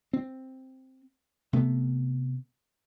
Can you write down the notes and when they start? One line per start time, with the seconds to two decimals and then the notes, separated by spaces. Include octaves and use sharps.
0.13 C4
1.53 C3 A3 B3